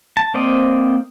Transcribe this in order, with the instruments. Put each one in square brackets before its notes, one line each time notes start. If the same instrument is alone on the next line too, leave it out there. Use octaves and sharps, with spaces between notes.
[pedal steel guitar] A5
A#3 C4 C5 D5 D#5